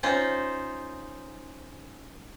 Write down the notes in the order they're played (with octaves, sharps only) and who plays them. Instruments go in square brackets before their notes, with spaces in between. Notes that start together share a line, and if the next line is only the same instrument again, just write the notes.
[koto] C#4 D#4 F4 C5